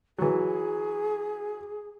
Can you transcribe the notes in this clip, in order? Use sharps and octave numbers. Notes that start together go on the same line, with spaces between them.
E3 F#3 G#4